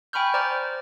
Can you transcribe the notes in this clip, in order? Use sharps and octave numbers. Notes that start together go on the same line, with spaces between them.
G5 G#5 B5 C#6 F6 G6
C5 D5 A#5 D6 F6